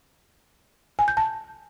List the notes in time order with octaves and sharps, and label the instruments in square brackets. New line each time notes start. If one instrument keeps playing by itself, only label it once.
[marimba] G#5
G6
A5